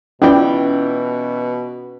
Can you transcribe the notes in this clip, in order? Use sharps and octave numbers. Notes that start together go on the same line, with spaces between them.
B2 E3 C#4 F4 D5 G5